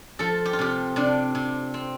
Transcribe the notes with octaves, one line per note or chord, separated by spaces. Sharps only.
F3 A4
G4
F4
C3 G4
C3 D4
C3
C4